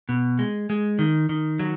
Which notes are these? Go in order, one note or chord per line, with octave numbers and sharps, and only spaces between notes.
B2
G#3
G#3
D#3
D#3
F#3